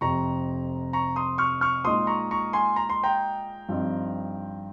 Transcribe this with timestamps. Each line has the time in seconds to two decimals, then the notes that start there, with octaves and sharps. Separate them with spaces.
0.01 F1 F2 C3 A#5 C#6
0.93 A#5 C#6
1.16 C6 D#6
1.38 C#6 F6
1.61 C#6 F6
1.85 A#2 G#3 D#4 C6 D#6
2.07 A#5 C#6
2.31 A#5 C#6
2.53 G#5 C6
2.76 A#5
2.89 C6
3.03 G5 A#5
3.69 G2 F3 C4 D#4